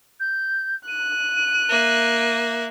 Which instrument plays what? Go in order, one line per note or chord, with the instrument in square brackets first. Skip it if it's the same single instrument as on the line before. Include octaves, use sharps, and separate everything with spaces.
[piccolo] G6
[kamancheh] F#6 [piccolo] D#7
[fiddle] A#3 E5